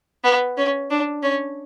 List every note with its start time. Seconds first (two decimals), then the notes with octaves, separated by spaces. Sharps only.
0.24 B3
0.57 C#4
0.90 D4
1.23 C#4